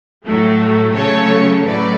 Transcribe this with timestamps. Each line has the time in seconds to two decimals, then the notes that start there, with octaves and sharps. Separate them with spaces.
0.24 A2 F#3 A3
0.94 C#3 F#3 A3 A4 C#5
1.65 A2 F#3 A3 B4 D5